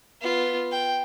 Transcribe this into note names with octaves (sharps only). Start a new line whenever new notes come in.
B3 F4
G5